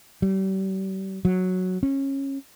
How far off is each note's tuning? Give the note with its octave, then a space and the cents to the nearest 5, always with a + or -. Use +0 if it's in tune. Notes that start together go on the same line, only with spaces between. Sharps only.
G3 -40
F#3 -5
C#4 -20